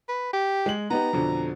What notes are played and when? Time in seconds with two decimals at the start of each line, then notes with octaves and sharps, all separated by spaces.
0.09 B4
0.33 G4
0.66 G#3 F#7
0.90 B3 D#4 G4 A#5
1.13 F2 B2 D3